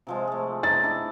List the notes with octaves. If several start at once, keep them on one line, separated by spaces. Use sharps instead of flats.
C3 F3 G#3
A3 G#4
D#4 A6
D4 E4 G5